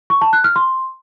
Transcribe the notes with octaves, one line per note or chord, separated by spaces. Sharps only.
C#6
A5
F#6
F6
C6